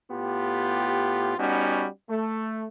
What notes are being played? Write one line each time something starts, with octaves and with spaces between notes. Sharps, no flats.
A2 B3 F4 G4
G3 B3 C#4 D#4 F#4
A3